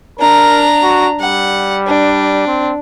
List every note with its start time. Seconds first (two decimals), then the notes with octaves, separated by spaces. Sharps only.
0.19 D4 A#4 A#5
0.83 F#4
1.20 G3 F#5
1.87 D4
2.47 C4